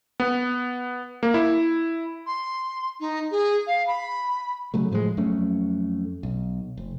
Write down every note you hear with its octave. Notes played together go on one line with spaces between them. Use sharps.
B3
A#3
E4
C6
D#4
G#4
F5
B5
C#3 F#3 A3
A2 F3 G3 G#3
F2 F#3 A3 C#4
B1
F1